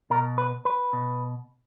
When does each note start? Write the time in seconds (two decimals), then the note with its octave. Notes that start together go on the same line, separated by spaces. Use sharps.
0.10 B2 A#4
0.38 B4
0.65 B4
0.93 B2